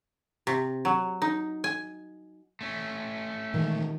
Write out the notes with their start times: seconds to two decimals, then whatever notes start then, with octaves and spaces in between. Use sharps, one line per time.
0.47 C3
0.85 F#3
1.22 D#4
1.64 G#5
2.61 A3 C#4
3.54 A#2 D#3 E3 G#3